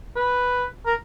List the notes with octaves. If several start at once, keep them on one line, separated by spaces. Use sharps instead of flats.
B4
A#4